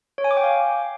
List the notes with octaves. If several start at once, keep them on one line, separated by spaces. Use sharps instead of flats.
C#5
G#5
D6
G5
F5